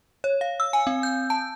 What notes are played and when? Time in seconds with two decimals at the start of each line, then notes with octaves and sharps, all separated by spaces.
0.24 C#5
0.41 F5
0.60 E6
0.73 G#5
0.87 C4
1.03 G6
1.30 A5